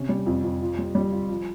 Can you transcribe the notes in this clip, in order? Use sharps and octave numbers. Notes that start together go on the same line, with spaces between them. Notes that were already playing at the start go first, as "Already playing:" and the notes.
Already playing: C3 C#4
G3
F2
F2
F4
G3
G3
F4
F3